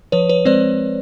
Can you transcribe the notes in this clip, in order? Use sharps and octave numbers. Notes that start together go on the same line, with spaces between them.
F3 B4 C#5
B4 C#5
G#3 C4 C5 D5